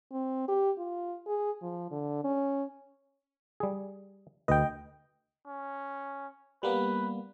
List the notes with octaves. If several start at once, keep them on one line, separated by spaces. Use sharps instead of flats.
C4
G4
F4
G#4
F3
D3
C#4
G3 G#4
D2 B4 D#5 G5
C#4
G3 A#3 B3 B4